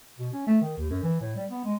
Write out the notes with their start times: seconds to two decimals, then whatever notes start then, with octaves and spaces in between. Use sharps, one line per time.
0.19 B2
0.33 C#4
0.47 A3
0.61 D#3
0.77 D#2
0.90 F#2
1.03 E3
1.21 A2
1.36 G3
1.50 B3
1.64 G#3